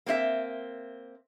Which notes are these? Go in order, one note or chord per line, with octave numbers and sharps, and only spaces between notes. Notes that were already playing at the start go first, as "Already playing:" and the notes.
A#3 C4 F4 E5